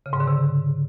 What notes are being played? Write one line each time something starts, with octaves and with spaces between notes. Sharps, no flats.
C#3
G#2
D3
C3